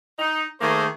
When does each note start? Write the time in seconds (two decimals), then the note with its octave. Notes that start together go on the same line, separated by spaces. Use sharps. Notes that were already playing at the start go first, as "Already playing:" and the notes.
0.19 D#4
0.61 D#3 A3 A#3 G#4 C5